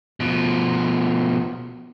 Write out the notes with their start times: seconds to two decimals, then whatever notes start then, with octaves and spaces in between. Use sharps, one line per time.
0.20 B2 F3